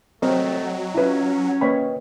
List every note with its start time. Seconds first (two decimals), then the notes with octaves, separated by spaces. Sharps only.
0.22 G1 F#3 G3 A3 C4 A#4 D#5 G5
0.95 C#4 E4 F4 B4
1.61 A#3 B4 C#5 D#5 G5 B5